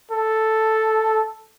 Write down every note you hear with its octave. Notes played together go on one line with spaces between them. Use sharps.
A4